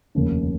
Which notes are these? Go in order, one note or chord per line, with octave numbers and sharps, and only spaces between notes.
F1 D#2 C#3